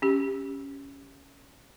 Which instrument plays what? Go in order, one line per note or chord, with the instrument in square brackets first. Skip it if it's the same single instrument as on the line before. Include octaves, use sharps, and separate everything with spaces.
[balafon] C#4 G4